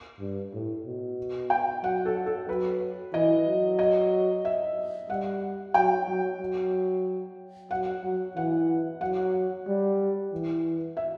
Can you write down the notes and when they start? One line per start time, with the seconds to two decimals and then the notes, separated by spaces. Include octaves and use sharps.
0.20 G2
0.53 A2
0.85 B2
1.50 G5
1.83 F#3 F#5
2.05 A4
2.26 A4
2.48 F#3 B4
3.13 E3 D#5
3.47 F#3
3.79 D#5
4.45 E5
5.10 G3 F#5
5.74 F#3 G5
6.08 F#3
6.40 F#3
7.71 F#3 F#5
8.03 F#3
8.35 E3 F#5
9.01 F#3 F#5
9.67 G3
10.32 E3
10.97 E5